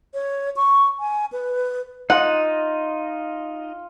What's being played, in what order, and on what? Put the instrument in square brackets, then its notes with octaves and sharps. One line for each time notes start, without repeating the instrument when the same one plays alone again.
[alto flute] C#5
C#6
G#5
B4
[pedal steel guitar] D#4 D#5 [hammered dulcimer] F4 [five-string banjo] F#5